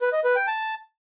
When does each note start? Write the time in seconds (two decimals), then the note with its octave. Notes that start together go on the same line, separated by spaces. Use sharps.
0.01 B4
0.13 D#5
0.24 B4
0.36 G5
0.47 A5